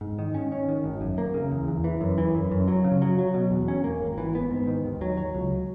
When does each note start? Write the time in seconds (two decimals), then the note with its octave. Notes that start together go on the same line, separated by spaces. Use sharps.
0.01 G#2
0.19 D#3
0.35 C#4
0.52 C#4
0.69 D#3
0.84 G#1
1.01 F#2
1.18 A#3
1.34 C#3
1.52 E2
1.68 E2
1.84 E3
2.01 F#2
2.18 E3
2.35 F#2
2.52 F#2
2.68 F#3
2.84 C#3
3.02 F#3
3.18 F#3
3.34 B2
3.51 E2
3.68 C#4
3.84 A#3
4.01 G#1
4.18 E3
4.35 B3
4.51 G#2
4.67 D#3
4.85 D#2
5.01 F#3
5.17 F#3
5.35 C#2